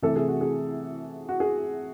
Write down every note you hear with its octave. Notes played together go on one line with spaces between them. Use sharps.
C3 E3 A3 A4
G#4
F#4
G#4
F#4
G#4